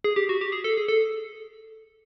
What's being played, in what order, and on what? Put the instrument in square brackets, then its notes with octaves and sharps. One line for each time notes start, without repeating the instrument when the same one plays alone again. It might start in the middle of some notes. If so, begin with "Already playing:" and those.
[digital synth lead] G#4
G4
F#4
G4
G#4
A4
G#4
A4